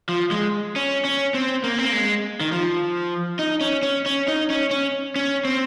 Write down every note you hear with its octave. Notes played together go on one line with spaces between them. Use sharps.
F3
G#3
C#4
C#4
C4
A#3
C4
A#3
G#3
D#3
F3
D#4
C#4
C#4
C#4
D#4
C#4
C#4
C#4
C4